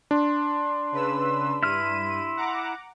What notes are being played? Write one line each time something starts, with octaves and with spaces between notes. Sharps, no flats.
D4 C6
C#3 B4 E6
G2 E4 F6 D#7
F#5 A#5 D6